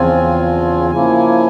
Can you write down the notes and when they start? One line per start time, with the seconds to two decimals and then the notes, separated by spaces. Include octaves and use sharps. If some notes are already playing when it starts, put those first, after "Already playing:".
Already playing: E2 C#3 F3 C4 F4 G#5
0.90 C#3 F3 A#3 E4 G#5